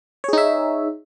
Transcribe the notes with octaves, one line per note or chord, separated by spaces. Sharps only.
D#4 G#4 C#5 E5